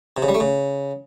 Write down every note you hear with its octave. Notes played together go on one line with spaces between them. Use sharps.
C3
C#3
G3
A3
C#3